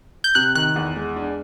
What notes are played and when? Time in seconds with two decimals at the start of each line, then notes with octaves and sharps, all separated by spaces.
0.24 G6
0.35 C3 F#6
0.55 D#3 F#6
0.76 E2
0.96 G#3
1.16 D4